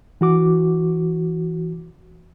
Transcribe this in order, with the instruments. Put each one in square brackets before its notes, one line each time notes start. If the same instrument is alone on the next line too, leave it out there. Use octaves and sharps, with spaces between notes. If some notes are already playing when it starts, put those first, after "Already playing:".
[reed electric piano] E3 F#4 D6